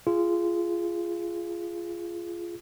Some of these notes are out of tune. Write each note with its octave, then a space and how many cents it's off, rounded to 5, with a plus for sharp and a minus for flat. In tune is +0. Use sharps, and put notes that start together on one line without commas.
F4 -20 G#4 +0